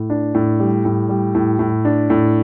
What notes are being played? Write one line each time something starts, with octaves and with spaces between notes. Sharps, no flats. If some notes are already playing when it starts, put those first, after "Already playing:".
Already playing: A2
D4
A2
G3
A2
G3
A2
A2
D4
A2